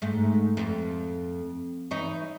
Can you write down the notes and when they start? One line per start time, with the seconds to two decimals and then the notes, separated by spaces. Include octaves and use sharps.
0.02 G#2 A3
0.57 F2
1.91 E3 D#4 C#5